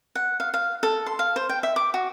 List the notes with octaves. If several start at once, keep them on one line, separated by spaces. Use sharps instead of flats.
F#5
F5
F5
A4
C6
F5
C5
G5
E5
D6
F#4